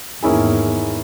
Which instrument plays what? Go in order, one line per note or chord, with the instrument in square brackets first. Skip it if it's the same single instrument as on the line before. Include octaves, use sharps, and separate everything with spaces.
[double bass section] E2 G#2 [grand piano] D#3 A#3 C#4 E4 G#4